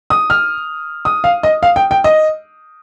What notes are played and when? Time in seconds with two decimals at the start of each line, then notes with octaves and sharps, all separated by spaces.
0.10 D#6
0.30 F6
1.05 D#6
1.24 F5
1.43 D#5
1.63 F5
1.76 G5
1.91 G5
2.04 D#5